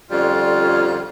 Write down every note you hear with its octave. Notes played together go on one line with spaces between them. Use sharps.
F2 D3 G3 C#4 F4